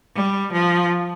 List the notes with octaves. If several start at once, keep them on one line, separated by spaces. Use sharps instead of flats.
G3
F3